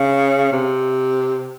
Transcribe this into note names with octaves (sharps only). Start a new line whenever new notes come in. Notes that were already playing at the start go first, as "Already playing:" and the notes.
Already playing: C#3
C3